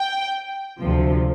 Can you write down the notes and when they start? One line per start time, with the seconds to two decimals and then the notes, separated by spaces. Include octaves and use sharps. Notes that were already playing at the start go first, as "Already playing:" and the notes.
Already playing: G5
0.79 D2 C3 F3